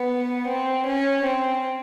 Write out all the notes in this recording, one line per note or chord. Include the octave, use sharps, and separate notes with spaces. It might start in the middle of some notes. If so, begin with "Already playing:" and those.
Already playing: B3
C4
C#4
C4